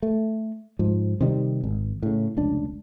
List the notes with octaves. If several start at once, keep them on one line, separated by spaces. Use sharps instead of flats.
A3
G#2 F3
C3 D#3 G3
G#1
A2 C#3
F1 C#2 D4